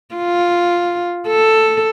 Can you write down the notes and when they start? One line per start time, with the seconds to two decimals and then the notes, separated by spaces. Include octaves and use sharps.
0.15 F4
1.27 A4